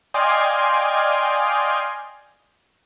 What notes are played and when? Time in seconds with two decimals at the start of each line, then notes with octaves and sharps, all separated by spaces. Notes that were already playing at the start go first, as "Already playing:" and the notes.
0.14 D5 D#5 F5 G5 G#5 C6